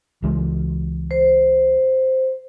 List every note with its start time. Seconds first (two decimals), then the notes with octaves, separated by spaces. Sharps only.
0.22 C#2 E3 G#3
1.11 C5